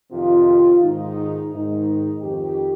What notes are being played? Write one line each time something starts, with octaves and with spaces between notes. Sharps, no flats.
F2 C3 D#3 F4
G#2 D#3 D#4
G#2 D#3 D#4
F2 D#3 G4